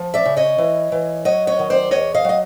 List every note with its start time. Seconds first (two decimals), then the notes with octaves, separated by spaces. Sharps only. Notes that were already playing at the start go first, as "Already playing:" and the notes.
Already playing: F3
0.14 D5 E5
0.25 C#3
0.36 C#5 D#5
0.58 E3
0.92 E3
1.25 F#3 C#5 D#5
1.47 C#5 D#5
1.59 D#3
1.70 C5 D5
1.91 E2 C#5 D#5
2.14 D#5 F5
2.24 F#3 D#5